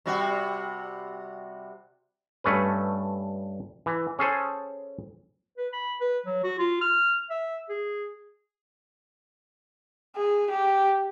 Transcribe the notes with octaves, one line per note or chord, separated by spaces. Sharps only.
C3 G3 F#4
G2 A3 C#4 B4
E3
C#4 G#4 A4 C5
B4
B5
B4
F#3
F#4
F4
F6
E5
G#4
G#4
G4